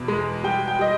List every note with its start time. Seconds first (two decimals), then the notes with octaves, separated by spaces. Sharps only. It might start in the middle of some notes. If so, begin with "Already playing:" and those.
Already playing: E2 B2
0.08 G#3
0.43 G3 G5
0.68 G5
0.79 G3 D#5